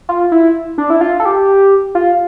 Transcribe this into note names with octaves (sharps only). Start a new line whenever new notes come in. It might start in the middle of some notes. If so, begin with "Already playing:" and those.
F4
E4
D4
E4
F4
A4
G4
F4